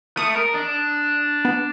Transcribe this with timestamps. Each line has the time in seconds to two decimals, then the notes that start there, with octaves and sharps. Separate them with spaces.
0.17 A3 D#6
0.36 A#4
0.54 D4
1.45 B3